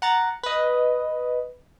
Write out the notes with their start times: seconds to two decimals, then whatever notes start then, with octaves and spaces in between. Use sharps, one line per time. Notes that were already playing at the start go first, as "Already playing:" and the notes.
0.02 F#5 A#5 A6
0.43 B4 D#5